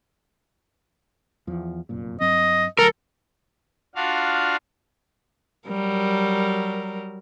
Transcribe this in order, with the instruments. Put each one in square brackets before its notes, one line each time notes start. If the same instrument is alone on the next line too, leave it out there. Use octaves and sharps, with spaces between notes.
[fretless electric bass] E2 F3
F1 F#2 A#2
[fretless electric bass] G2 F#3 C4 [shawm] D#5
[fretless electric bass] D2 F#3 [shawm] A4 [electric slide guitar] A#4
[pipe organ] D4 F4 F#4 F5
[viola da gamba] F#3 G3 A#4